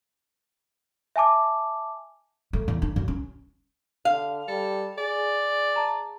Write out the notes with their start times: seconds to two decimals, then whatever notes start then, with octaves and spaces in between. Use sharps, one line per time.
1.16 E5 G#5 A5 D6
2.53 A3
2.68 E2
2.82 D4
2.96 F#2
3.08 C#4
4.05 D3 F5
4.48 G3 A4
4.98 G#4 D5
5.76 A5 A#5